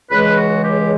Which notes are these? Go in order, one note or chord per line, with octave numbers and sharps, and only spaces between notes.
C#2 C#3 E3 G#3 B4
F#4
G4